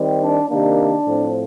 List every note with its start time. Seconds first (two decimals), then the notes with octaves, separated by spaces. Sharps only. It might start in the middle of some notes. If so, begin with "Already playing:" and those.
Already playing: D#3 G3 C4
0.21 D4
0.48 C3 D#3 A#3 D4
1.05 A2 F3 C4